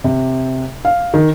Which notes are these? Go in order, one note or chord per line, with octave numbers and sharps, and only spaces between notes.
C3
F5
D#3